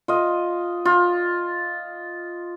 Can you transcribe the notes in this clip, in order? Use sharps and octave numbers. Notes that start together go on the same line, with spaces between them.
F4 D#5
F4